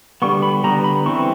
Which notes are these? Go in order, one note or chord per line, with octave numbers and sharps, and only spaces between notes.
D3 G3 B3 C#6
B5
D3 G3 B3 A#5
B5
E3 G3 C4 C#6